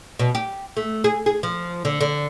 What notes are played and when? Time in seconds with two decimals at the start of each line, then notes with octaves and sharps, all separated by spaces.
0.19 B2
0.35 G4
0.77 A3
1.04 G#4
1.26 G#4
1.43 F3
1.85 D3
2.01 D3